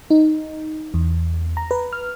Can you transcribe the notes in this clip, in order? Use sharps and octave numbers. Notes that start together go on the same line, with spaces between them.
D#4
E2
A#5
B4
F6